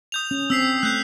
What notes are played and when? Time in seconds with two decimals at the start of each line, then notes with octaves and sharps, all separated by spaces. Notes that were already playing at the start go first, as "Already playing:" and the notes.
0.12 D#6 G6 F7
0.31 C#4
0.50 C4 E6 B6 C7
0.83 A3 F#6 G6 C7